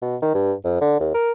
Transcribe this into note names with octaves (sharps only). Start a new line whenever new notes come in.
B2
D#3
G2
F2
D3
D#2
A#4